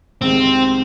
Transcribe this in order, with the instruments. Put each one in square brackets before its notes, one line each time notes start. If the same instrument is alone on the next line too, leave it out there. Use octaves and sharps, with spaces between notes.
[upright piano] C2 C3 D#3 G#3 [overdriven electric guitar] C4